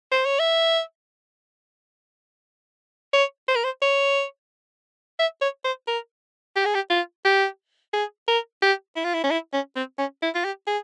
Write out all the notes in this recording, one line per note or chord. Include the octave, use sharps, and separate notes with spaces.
C5
C#5
E5
C#5
C5
A#4
C5
C#5
E5
C#5
C5
A#4
G4
G#4
G4
F4
G4
G#4
A#4
G4
E4
F4
E4
C#4
E4
C#4
C4
C#4
E4
F4
G4
G#4